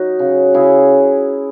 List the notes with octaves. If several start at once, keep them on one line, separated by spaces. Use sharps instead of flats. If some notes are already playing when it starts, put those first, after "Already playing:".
Already playing: F#3 D#4 F#4
C#3
C#3 E4 G#4